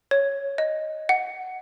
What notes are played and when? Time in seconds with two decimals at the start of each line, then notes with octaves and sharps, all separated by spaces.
0.11 C#5
0.58 D#5
1.09 F#5